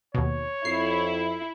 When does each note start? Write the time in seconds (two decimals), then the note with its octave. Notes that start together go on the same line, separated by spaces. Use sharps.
0.15 D#2 B2 C#5
0.65 F2 E4 C7